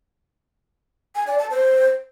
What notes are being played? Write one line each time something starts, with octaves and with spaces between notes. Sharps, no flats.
G#5
D5
A5
C5